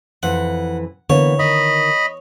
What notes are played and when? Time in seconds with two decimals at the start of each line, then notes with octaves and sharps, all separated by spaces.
0.23 F2 E3 F#5
1.10 D3 E3 A#3 B3 C#5
1.39 D#3 D#5 B5